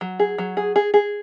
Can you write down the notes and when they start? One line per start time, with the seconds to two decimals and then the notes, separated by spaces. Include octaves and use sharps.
0.01 F#3
0.20 G#4
0.38 F#3
0.57 G#4
0.76 G#4
0.94 G#4